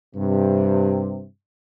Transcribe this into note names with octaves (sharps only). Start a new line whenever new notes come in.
G2 C3